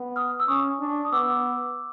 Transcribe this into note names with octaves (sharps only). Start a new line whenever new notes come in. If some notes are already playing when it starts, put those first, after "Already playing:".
Already playing: B3
D#6 F6
E6
C#4 C#6 D#6
D4
D#6
B3 D6 E6